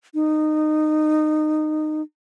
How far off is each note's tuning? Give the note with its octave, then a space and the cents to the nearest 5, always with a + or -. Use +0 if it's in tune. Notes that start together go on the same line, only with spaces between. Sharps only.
D#4 -20